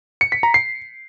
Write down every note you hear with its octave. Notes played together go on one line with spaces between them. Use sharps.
C#7
B6
A#5
C7